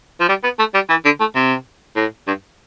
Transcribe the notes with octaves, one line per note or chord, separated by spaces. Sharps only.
F3
G3
B3
A3
G3
E3
D3
A3
C3
A2
G2